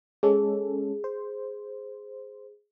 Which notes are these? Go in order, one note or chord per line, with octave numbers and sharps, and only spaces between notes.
G#3 C#4 G#4 A4
C5